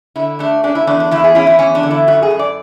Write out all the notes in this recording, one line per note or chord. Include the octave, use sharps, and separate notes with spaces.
D3 E4
A3 D4
C#4 D4
E4
E2 D4
D4
E2 E4
G#4
C#4 E4
E4
E2 C#4
D4
D3
E4
F#2 F#4
G#4
F#2
D5